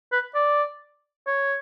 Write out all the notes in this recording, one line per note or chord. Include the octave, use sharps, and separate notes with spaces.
B4
D5
C#5